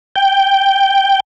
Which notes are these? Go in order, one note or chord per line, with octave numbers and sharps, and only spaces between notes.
G5